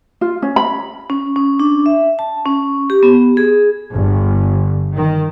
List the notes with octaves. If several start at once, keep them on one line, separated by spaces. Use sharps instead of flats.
F4
C#4
B5
C#4
C#4
D4
E5
A5
C#4
G4
B3
G#4
G1
D#3